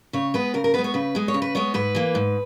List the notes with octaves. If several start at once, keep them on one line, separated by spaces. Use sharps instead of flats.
C#3 C#5
G#3 B3 B4
C#3 A#4
A#4
G#3 B3 B4
C#5
C#3 B4
G#3 B3
C#5
C#3
B4
G#3 B3 C#5
G#2 B4
E3 A#3
G#2